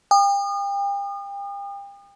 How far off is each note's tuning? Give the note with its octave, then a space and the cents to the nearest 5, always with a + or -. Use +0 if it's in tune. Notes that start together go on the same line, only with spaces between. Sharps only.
G5 +35 D#6 -35